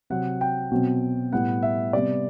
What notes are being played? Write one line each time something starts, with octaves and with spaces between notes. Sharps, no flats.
C3 F#3 C4 F#5
G5
B2 F#3 C4
A2 G3 B3 F#5
E5
C3 G3 B3 D5